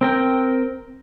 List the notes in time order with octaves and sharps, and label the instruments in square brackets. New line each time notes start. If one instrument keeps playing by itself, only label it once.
[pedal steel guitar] C4 A#4 G5